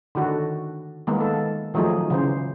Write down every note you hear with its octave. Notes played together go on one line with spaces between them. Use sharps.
D3 D#3 F#4 A4
D#3 G#3 A#3 B3
A4
D#3 F3 F#3 A3 D#4 G#4
C#3 E3 C5